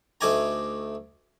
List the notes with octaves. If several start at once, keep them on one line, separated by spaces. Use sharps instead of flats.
D2 A3 D#4 D5 G#5 A#5